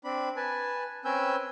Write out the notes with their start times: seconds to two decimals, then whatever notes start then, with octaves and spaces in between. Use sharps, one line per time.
0.04 C4 D4 B5
0.37 B4 G#5 A5
1.05 C4 C#4 B4 G#5 E6 G6